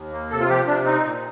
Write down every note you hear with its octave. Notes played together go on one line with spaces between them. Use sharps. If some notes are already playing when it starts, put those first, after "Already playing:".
Already playing: D#2
A#3
C3 A4
F4
F3 G4
C3 D4
C4 D#4
A#2